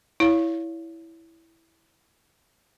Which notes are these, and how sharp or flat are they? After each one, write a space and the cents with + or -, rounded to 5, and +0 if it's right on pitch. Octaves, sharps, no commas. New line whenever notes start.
E4 +0 C#5 +30 F5 +0